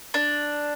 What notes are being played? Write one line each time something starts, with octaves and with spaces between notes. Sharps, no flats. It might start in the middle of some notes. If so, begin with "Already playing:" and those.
D4